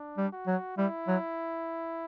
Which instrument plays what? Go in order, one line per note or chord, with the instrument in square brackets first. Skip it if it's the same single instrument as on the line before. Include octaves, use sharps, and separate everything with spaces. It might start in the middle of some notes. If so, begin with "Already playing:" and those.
Already playing: [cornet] D4
[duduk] G3
[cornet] F#4
[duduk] F#3
[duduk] G3 [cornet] E4
[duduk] F#3